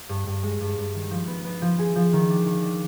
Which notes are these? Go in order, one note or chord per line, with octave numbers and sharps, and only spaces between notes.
G2
G2
G#3
G2
G2
D#3
F3
B3
B3
F3
G#4
F3
D#3
D4
D#3
D4